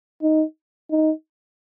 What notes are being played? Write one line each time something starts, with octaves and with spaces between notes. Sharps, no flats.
D#4
D#4